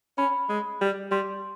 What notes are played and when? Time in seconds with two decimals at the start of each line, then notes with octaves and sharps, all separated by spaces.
0.18 C#4 B5
0.49 G#3
0.81 G3
1.11 G3 C6